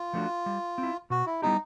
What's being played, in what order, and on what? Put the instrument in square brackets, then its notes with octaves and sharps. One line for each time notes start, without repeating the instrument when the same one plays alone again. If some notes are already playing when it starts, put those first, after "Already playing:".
Already playing: [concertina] F4
[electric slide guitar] F3 A3 D4 F#4
G3
C4
E4
[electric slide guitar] B2 [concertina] F#4
[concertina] E4
[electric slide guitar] G3 B3 E4 G4 [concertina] D#4